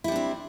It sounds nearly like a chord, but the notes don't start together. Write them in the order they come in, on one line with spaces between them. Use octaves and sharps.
E4 G3 D4 C4